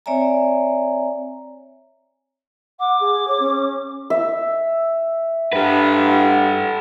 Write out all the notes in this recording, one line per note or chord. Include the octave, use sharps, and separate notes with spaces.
C4 C#5 D5 E5 G#5 A#5
F#5 D6
G#4
C#5
C#4
E5
G2 A4 B4 F#5